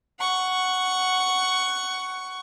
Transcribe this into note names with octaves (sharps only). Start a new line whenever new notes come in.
F#5 C#6